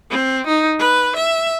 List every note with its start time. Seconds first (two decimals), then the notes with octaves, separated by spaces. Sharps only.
0.11 C4
0.47 D#4
0.79 B4
1.16 E5